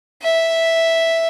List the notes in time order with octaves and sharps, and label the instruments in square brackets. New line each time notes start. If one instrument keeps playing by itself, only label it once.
[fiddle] E5